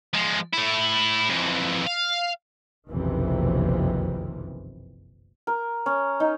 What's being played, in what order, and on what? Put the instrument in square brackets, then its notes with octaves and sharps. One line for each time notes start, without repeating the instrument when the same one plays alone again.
[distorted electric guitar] F3 G#3
A3 E4
F2 E3
F5
[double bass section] F#1 B1 F2 C3 D#3 E3
[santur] A#4
C#4
D#4